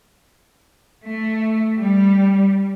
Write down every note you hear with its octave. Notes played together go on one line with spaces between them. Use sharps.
A3
G3